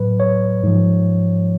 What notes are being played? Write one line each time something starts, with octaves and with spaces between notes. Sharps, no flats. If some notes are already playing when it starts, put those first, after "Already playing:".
Already playing: A2 F#3 B4
C#5
G#2 F3